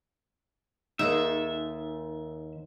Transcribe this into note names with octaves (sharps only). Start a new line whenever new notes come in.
D#2 D#4 G#4 A4 E5